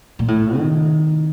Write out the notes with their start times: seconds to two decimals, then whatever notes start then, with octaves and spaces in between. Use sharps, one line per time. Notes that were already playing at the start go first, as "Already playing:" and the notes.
0.19 A#2
0.28 A2
0.58 D#3